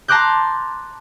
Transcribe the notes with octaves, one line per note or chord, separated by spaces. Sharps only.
A5 A#5 C6 D6 F#6 G6